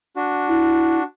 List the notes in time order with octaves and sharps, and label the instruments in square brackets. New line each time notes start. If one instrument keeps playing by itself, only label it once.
[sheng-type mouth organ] D4 F#4
[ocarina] E4